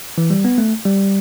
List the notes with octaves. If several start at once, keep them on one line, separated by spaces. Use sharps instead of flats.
E3
G3
B3
A3
G3